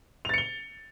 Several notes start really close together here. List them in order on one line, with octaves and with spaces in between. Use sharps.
F7 A6 C#7 G7